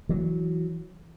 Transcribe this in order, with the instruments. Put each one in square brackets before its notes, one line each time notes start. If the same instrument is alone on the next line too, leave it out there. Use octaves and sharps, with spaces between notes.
[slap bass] E3 F#3